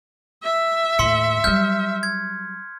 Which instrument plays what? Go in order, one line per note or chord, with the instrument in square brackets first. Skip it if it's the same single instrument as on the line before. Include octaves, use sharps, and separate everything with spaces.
[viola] E5
[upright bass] D#2 A2 [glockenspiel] C6 B6 C#7
[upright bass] F#3 G3 [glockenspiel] F6 G6
[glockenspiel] G#6